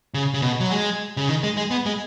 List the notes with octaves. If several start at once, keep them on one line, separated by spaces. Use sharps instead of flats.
C#3
C#3
B2
F#3
G#3
C#3
D#3
G#3
G#3
B3
G#3